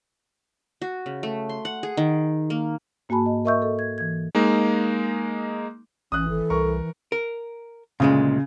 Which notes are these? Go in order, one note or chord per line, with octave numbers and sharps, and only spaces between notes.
F#4
C#3
A3
C6
F#5
G#4
D#3
A#3
G#2 A#3 F#4 G#5 A5 B5
D#5
A#4 D#5 E5 C#6 E6 G6
A4 D#5
G#6
E3 G#6
G#3 A#3 D#4
A1 E3 C#4 D#6 F#6
G#1 A4
C2 A#4 C#6
A#4
D2 A#2 C#3 G#3